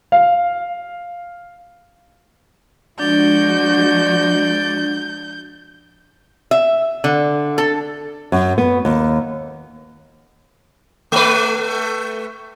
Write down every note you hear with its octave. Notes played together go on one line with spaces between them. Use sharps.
F5
F3 G#3 D4 F#4 D5 G6
E5
D3
A4
F#2
B3
D#2
A3 B4